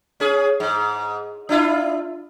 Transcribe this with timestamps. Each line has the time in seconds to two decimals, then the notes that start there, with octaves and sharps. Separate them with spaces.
0.20 C#4 G#4
0.60 G#2
1.49 D4 E4 F4